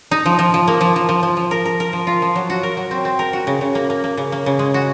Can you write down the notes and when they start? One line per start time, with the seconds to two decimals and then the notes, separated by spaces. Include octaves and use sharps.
0.11 D#4
0.26 F3
0.39 F3
0.54 F3
0.68 A#3
0.81 F3
0.96 F3
1.09 F3
1.23 F3
1.37 F3
1.51 A#4
1.65 A#4
1.80 A#4
1.93 F3
2.07 F4
2.22 F3
2.36 F#3
2.50 F#4
2.63 A#4
2.77 F#3
2.91 C4
3.05 C4
3.19 A#4
3.33 F#4
3.47 C#3
3.61 C#3
3.75 A#3
3.90 A#3
4.04 A#3
4.17 C#3
4.32 A#3
4.46 C#3
4.59 G#3
4.74 F#4